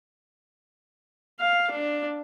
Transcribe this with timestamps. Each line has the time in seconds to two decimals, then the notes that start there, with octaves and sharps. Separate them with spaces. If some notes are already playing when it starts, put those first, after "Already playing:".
1.40 F5
1.71 D4